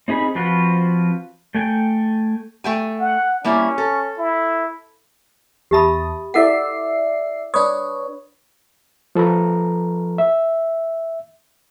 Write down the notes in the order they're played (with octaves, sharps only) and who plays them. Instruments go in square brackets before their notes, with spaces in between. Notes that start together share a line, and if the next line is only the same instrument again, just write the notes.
[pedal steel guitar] C4 D#4 G#4 B5
F3 C4 F4 F#4 B4
A3 G5 G#5
[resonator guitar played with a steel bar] A3 G5 G#5
[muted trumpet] F#5
[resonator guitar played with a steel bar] G3 A#3 E4 [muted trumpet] C#4
[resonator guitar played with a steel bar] A4
[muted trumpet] E4
[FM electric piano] E2 A5 D#6 [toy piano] G4 E5 B5
[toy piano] E4 A4 F#5 [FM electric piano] D5 E5 C7
[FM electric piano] D4 B4 C#5 [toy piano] D#6
[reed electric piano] F3 A4 B4 A#5
E5